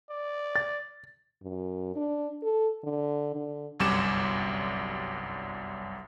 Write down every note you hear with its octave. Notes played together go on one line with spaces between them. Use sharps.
D5
A6
F#2
D4
A4
D3
D3
G1 C2 F#2 G3 D6 E7